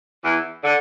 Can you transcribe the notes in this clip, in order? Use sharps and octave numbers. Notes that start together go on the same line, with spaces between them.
E2 E3
D3